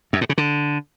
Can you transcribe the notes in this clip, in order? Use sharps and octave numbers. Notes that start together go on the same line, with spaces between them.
F#2
A2
C#3
D3